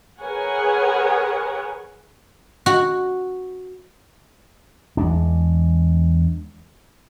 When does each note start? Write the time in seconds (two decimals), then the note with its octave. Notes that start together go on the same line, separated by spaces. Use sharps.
0.21 G#4 A#4 B4 C#5 F#5 G#5
2.66 F#4
4.97 E2 G#3 D4